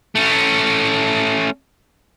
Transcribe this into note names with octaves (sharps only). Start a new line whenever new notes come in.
A3 C#4